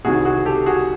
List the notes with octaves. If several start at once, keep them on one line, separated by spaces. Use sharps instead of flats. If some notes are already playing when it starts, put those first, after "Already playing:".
C2 C3 D#3 F#4 G#4
F#4 G#4
G4 A4
F#4 G#4